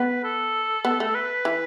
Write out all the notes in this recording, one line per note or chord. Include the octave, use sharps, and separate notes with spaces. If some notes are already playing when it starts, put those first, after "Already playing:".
Already playing: B3 B4
A4
B3
A3
B4
E3